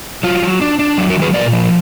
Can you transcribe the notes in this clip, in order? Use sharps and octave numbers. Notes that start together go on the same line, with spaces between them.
F#3 F4
F#3
D4
D4
F#3
F#4 A#4
D#3
G#4 B4
A#2 A#4 D5
F3